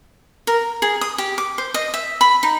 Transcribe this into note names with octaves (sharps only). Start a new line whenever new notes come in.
A#4
G#4
D#6
G4
D6
C5
D#5
E5
B5
D#4